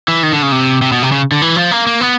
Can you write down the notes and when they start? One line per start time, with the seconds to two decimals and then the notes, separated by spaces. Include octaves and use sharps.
0.08 E3
0.23 D#3
0.33 D3
0.42 C#3
0.52 C3
0.82 C3
0.92 B2
1.02 C3
1.12 C#3
1.32 D3
1.42 E3
1.56 F3
1.71 A#3
1.87 A#3
2.01 B3